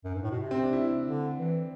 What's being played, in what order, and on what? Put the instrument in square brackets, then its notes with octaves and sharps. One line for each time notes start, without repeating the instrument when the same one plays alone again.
[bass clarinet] F#2
G2
A2
B2
C3
[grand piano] C4
D4
E4
[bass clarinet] D3
E3